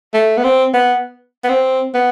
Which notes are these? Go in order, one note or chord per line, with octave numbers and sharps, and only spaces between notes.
A3
B3
C4
B3
B3
C4
B3